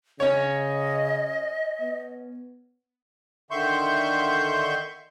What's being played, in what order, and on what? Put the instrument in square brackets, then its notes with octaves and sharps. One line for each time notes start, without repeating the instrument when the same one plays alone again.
[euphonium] C#3 [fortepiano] C#4 C#5 [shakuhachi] D#5
[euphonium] B3
[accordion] D3 D#3 E5 C6 C#6 G6